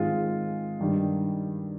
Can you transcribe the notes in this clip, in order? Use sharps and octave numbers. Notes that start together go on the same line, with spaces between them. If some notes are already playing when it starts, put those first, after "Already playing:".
Already playing: G#2 D#3 G#3 C4 F4
G2 D#3 G3